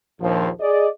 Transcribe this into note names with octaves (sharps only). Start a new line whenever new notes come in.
A#1 D#2 F3
G#4 D5 D#5